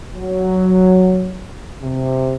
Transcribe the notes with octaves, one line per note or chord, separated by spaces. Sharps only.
F#3
C3